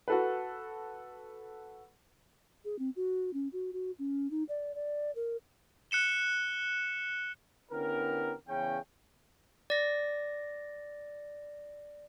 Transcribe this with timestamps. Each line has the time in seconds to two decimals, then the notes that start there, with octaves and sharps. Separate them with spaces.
0.08 F#4 A4 B4
2.65 G#4
2.79 C4
2.96 F#4
3.33 C#4
3.53 F#4
3.73 F#4
3.99 C#4
4.31 D#4
4.49 D5
4.75 D5
5.16 A#4
5.91 F#6 C#7 E7 G7
7.72 D3 B3 C#4 E4 G4 A#4
8.48 E2 C#3 C#4 G5
9.70 D5 A#6